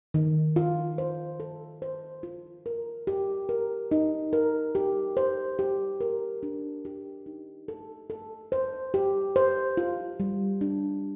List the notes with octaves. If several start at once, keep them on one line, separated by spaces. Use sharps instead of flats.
D#3
F4
C5
A4
C5
F4
A#4
G4
A#4
D#4
A#4
G4
C5
G4
A#4
D4
G4
D#4
A4
A4
C5
G4
C5
F4
G3
D4